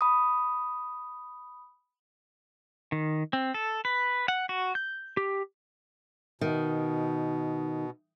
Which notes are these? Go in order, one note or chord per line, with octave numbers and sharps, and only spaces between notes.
B5 D#6
D#3
C4
A4
B4
F#5
F#4
G6
G4
B2 D#3